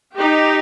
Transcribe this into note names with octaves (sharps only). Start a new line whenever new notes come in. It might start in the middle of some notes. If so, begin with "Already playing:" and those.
D#4 G4